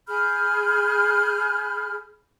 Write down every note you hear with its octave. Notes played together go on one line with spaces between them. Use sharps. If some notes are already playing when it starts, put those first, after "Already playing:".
G#4 B5 F6 G6